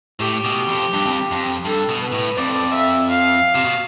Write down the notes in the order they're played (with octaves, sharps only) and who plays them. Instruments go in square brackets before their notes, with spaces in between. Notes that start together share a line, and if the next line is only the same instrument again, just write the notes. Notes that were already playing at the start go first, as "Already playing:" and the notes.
[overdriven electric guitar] A2 [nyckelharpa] G4
[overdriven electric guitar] B2
F2
G2
F2
F2
[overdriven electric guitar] G2 [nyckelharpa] A4
[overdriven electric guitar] B2
[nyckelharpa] B4
[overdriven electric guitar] A2
[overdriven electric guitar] F2 [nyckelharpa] D5
[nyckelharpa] E5
F5
[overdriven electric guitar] C3
B2